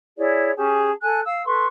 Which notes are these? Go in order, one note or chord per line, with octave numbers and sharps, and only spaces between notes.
E4 G#4 C#5 D5
C#4 G4 G#4 A5
A4 G#5 F#6
F5 E6
A4 B4 C6 C#6